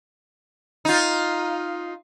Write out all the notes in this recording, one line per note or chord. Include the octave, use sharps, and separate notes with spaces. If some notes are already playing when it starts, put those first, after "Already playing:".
D#4 F4